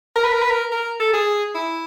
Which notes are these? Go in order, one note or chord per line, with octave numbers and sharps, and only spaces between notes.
A#4
B4
A#4
B4
A#4
A#4
A4
G#4
E4